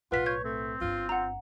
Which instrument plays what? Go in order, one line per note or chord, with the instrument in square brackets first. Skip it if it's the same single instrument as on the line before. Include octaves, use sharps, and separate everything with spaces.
[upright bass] B1 A2 [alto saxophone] F4 [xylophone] B4 B6 [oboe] F#5
[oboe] C#5 [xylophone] G6 G#6
[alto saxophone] A3 [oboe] C4
[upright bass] G1 G2 [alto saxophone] F4
[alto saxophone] F4 [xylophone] F#5 A#5